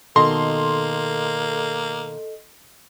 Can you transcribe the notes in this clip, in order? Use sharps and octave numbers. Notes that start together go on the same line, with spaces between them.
B2 D#3 A#3 A4 D#5 A#5 C6